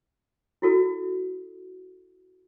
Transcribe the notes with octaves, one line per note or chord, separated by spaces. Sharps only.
E4 F#4 A4